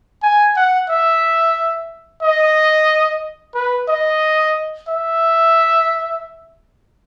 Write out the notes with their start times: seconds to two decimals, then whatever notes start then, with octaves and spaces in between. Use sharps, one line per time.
0.23 G#5
0.56 F#5
0.89 E5
2.22 D#5
3.54 B4
3.88 D#5
4.88 E5